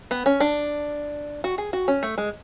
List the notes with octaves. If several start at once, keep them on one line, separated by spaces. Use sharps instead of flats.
B3
C#4
D4
F#4
G#4
F#4
C#4
A3
G#3